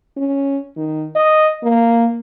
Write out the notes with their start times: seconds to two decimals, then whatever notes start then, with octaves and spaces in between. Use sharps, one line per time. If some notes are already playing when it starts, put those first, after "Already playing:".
0.17 C#4
0.76 D#3
1.15 D#5
1.63 A#3